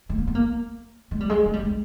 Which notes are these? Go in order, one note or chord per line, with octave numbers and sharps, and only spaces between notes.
A3
A#3
B3
A#3
G#3
G3
G#3
A3
G3
G#3